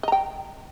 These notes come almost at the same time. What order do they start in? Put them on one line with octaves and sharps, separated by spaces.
D#5 A#5 G5